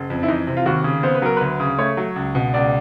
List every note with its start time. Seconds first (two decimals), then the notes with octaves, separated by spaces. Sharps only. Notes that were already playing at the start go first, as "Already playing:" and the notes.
Already playing: F#1
0.10 F2
0.23 E4
0.28 E3 D#4
0.47 C3
0.57 F4
0.66 D#2 F#4
0.84 C#3
1.03 B3 C5
1.15 B4
1.22 F#3 A#4
1.37 D2 B4
1.60 C#3
1.78 A3 C#5
1.97 F#3
2.16 C#2
2.35 B2
2.54 C#2 D5